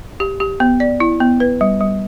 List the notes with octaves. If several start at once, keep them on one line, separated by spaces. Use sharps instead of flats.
G4
G4
B3
D5
E4
B3
B4
G3
G3